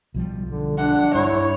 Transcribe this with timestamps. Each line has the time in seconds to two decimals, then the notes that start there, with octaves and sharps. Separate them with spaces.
0.14 B1 F3 G3
0.49 D3
0.78 D4 F#5
1.15 G2 E4 C#5